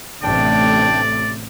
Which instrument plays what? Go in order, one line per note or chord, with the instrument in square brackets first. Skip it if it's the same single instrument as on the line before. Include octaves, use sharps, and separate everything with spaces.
[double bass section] A1 C3 A3 [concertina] D4 G5 [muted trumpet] D5